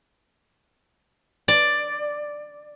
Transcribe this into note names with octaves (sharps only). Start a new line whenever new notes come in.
D5